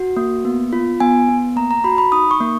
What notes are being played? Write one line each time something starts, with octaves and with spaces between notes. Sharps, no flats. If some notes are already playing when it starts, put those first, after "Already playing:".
Already playing: F#4
A#3
B3
F4
B3 G#5
B3
A#3 A#5
A#5
F#4 B5
B5
D#4 D#6
C#6
A#3